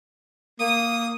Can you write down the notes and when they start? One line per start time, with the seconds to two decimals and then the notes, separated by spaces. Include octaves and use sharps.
0.60 A#3 D#6